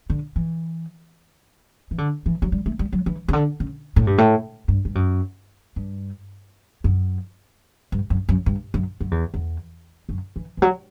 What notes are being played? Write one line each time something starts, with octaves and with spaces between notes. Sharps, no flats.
D3
E3
E3
D3
E3
F#3
G3
A3
G3
F#3
E3
C#3
D3
C#3
A2
G2
A2
G2
G2
F#2
G2
F#2
G2
F#2
F#2
G2
F#2
F#2
E2
E2
F#2
E3
E3
F#3